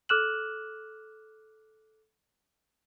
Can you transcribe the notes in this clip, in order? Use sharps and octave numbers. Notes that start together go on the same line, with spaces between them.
A4 D6 F6 F#6 E7 F#7